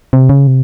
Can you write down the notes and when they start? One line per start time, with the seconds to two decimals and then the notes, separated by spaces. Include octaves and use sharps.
0.13 C3
0.29 C#3
0.47 C3